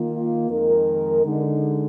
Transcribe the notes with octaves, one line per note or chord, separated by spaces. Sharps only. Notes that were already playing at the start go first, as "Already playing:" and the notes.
Already playing: D#3 A#3 F4
F2 D#3 G#3 D#4 A#4
D3 G#3 D#4